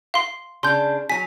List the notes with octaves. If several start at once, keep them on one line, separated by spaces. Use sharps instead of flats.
F5 C6
C#3 D4 C6 G6
F#3 G#5 B6